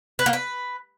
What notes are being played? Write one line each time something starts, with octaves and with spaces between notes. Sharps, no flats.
B4
A#3
B4